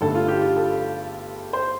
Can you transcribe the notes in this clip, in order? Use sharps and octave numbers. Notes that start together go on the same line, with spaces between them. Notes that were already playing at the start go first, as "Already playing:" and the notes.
G1 G2 D3 A3 D4 A4
F4
G4
F4
A4
C5